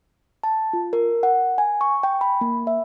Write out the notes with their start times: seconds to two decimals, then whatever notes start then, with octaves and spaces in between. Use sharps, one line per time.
0.44 A5
0.73 F4
0.93 A#4
1.23 F#5
1.58 G#5
1.81 C#6
2.03 G5
2.21 B5
2.41 A#3
2.67 E5